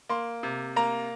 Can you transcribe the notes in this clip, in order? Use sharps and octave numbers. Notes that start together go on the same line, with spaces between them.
A#3 C6
C3
A#3 A#5